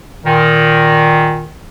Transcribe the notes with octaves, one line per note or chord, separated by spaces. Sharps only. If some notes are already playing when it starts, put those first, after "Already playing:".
A#2 D#3